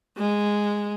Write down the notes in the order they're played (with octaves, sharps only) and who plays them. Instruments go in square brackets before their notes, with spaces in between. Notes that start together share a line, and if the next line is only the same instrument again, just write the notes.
[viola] G#3